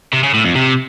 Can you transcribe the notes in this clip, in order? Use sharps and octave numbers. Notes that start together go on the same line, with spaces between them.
C3
C#3
A2
F2
C3